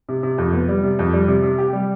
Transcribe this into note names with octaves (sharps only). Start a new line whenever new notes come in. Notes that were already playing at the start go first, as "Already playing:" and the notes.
C3
C3
F2
B3
G3
C3
F2
G3
C3
C3
G4
G3